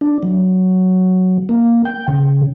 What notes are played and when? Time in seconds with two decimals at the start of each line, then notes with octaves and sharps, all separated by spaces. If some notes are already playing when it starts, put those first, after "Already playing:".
0.01 D4
0.23 F#3
1.49 A#3
1.85 G5
2.08 C#3